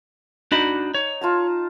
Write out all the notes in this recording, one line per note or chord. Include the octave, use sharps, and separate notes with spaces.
D4 D#4 F#4 B5
C#5
F4 A5 A#5